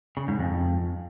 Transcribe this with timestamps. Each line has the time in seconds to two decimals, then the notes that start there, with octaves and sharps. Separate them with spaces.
0.17 C#3
0.28 G#2
0.39 F2